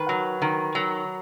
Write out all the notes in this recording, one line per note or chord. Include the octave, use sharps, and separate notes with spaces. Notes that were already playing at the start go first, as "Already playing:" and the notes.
Already playing: D#3 B4
F#3
D#3
F#3